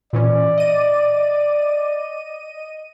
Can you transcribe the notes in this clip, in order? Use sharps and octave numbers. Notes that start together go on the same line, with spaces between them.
A#2 E3 C#4 D5
D#5 D#7